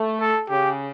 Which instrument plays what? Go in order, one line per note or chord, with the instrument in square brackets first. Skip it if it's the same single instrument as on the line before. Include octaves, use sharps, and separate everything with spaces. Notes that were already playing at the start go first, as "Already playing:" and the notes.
Already playing: [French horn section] A3
[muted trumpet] A4
[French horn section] C#3 [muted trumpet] G4